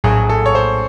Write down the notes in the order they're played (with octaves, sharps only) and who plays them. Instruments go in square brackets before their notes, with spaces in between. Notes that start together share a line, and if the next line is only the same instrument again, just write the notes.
[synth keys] A#1 A2 F#3 [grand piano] G#4
[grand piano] A4
C#5
C5